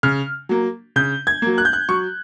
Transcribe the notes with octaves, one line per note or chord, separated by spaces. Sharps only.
C#3 F6
F#3 A#3
C#3 G6
G#6
F#3 A#3
F#6
G6
F#6
F#3 C#6